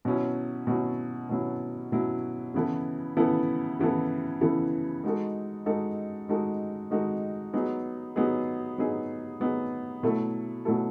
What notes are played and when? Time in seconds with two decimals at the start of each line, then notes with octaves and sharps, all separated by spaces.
0.05 B2 F#3 C#4 E4
0.67 B2 F#3 C#4 E4
1.29 B2 F#3 C#4 E4
1.92 B2 F#3 C#4 E4
2.54 C#3 E3 B3 E4 A4
3.17 C#3 E3 B3 E4 A4
3.79 C#3 E3 B3 E4 A4
4.41 C#3 E3 B3 E4 A4
5.04 G#3 D#4 F#4 A4
5.66 G#3 D#4 F#4 A4
6.29 G#3 D#4 F#4 A4
6.91 G#3 D#4 F#4 A4
7.53 F#3 B3 D#4 G#4
8.16 F#3 B3 D#4 G#4
8.78 F#3 B3 D#4 G#4
9.40 F#3 B3 D#4 G#4
10.03 B2 F#3 A3 E4 A4
10.65 B2 F#3 A3 E4 A4